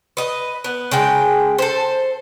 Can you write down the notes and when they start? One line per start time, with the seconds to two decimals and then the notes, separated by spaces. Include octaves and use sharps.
0.17 B4 D#5
0.64 B3
0.91 C#3 G#3 G5
1.58 A4 C5